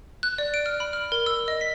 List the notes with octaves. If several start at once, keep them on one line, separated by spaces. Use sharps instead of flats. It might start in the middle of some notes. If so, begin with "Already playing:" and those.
F#6
D5
D7
F6
B5
F6
A#4
E6
D#5
B6